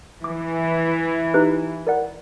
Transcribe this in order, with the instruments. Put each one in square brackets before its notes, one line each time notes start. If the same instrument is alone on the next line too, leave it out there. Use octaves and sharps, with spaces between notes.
[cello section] E3 [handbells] D6
[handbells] D#4 G4 B4
A#4 D5 F#5